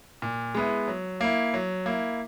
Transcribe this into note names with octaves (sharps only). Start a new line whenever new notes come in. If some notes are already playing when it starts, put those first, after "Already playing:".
A#2
G#3 B3 E4
F#3
A#3 E4
F#3
A#3 E4